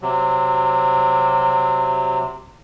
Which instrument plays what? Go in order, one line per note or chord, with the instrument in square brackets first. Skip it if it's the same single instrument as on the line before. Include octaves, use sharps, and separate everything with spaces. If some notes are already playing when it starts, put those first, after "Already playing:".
[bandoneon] C3 F#3